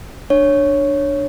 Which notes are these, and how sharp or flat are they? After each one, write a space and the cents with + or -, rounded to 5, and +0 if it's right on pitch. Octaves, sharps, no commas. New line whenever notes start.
D4 +10 C#5 +0